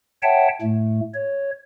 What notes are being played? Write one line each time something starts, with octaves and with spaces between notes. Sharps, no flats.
C#5 E5 F#5 G5 A5
A2 A3
C#5